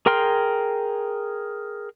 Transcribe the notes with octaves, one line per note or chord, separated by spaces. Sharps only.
G#4 A#4 G5 C6 F6